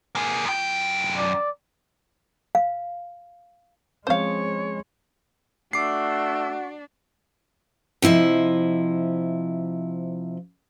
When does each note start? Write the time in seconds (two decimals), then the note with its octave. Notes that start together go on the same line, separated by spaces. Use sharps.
0.15 A#3 G#4
0.45 F#2 G5
1.17 D5
2.55 F5
4.07 F3 G#3 C4 C#4 C5 C#5 F5
5.73 A3 D4 F#4 D6 C7
8.02 C3 F3 E4 D#5